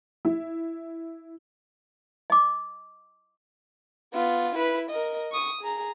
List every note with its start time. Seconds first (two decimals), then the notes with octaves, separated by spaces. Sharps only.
0.25 E4
2.30 D#5 D6
4.13 B3 F4
4.56 E4 B4
4.90 A#4 D#5
5.32 C#6 D#6
5.61 G#4 A#5